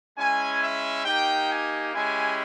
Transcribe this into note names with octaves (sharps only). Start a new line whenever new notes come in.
G#3 C#4 E4 G#5
E5
A#3 D#4 G4 G5
G#5
G#3 C#4 E4 G4 G#5